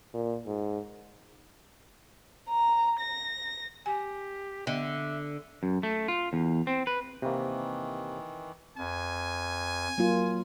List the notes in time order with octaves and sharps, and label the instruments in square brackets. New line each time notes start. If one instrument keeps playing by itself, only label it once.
[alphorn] A#2
G#2
[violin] A#5
A#6
[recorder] G4 [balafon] G#5
[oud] D3 [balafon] B3 D#5 [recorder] E5
[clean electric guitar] F#2
A3
F4
E2
C4
B4
[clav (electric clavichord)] C3 A#3 [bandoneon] D#3 E3
[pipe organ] F2 [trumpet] G#5
[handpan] F#3 A#3 F4